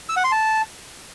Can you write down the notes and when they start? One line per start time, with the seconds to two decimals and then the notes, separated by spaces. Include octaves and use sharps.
0.09 E6
0.17 F#5
0.24 C6
0.32 A5